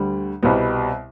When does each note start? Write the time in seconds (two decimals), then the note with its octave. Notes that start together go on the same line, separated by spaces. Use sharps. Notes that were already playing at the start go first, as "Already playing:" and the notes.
Already playing: D2 D3 G3
0.43 C2 B2 G3 B3